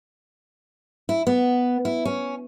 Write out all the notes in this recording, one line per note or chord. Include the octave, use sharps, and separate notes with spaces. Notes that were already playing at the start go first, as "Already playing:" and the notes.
E4
B3
E4
C#4